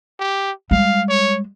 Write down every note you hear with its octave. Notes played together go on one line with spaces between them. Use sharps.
G4
G3 G#3 F5
C#5